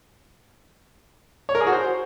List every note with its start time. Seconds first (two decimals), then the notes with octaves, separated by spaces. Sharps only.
1.49 C#5
1.55 A#4
1.61 G#4
1.67 F#4
1.72 C5